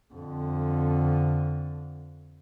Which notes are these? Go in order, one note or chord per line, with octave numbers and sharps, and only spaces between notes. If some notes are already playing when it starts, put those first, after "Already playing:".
F2 D3